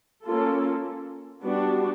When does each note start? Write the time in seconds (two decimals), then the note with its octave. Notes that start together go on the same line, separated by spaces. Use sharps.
0.25 A#3 C#4 F4 A4
1.44 G3 B3 D4 F#4